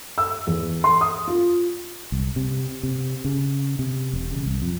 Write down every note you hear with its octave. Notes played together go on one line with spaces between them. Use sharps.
E6
E2
C6
D#6
F4
C2
C3
C3
C#3
C3
E1
C#3
C2
F2